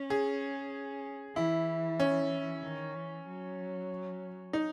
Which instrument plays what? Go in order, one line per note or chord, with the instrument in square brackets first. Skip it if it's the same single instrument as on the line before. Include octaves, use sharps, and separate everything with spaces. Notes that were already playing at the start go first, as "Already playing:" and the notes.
Already playing: [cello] C#4
[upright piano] G#4
[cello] E3 [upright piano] E4
[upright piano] C#4
[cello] D#3
E3
F#3
[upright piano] D#4